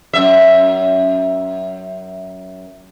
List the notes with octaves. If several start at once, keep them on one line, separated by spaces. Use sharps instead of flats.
F#2 E5